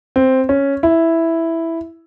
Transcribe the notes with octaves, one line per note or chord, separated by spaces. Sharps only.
C4
C#4
E4